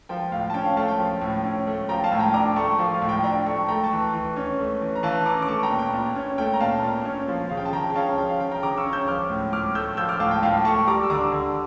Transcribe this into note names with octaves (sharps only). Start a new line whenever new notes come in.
F3 G5
A2 F5
A5
C#4 G5
F5
A3 F5 A5
G5
F3
A2
C#4
A3
F3 G5 A#5
F5 A5
A2
G5 A#5
D4 A#5 D6
A3 A5 C#6
F3
F5
A2
G5
D4 G5 A#5
A3 A5 C#6
A3 G5 A#5
A5 C#6
E3
E3
C#4
A3
E3
A#5
E3 F5 A5
C#4 A#5 D6
D6
A3 A5 C#6
G5 A#5
A#2
G5
A#2
C#4
A3 G5
A#5
A#2 F5 A5
A#2
C#4
F3
C#3 F5
G5
A5
C#3 G5 A#5
G5
C#4 F5 A5
F3 G5
F5
C#3 G5
G5 A#5
C#3 A#5 D6
C#6 E6
C#4
E6 G6
F3 D6 F6
A2
A2 D6 F6
A3 E6 G6
F3 E6 G6
D6 F6
A2 F5 A5
G5
A2 F5 A5
A3 A5 C#6
G3 A#5 D6
E6
D3 A#5 D6
D3